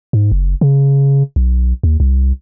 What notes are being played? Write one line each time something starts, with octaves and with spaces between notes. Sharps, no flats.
G#2
F#1
C#3
B1
D#2
C2